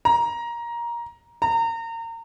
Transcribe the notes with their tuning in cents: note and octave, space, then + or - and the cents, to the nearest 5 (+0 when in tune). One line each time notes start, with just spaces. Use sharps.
A#5 +15
A#5 -30